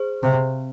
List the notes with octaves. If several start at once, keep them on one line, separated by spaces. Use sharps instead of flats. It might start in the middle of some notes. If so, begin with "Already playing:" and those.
Already playing: G#4 C5
C3 C4